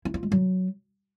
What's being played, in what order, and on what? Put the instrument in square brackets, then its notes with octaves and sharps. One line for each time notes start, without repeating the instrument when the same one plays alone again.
[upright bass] E4
F4
G#3
F#3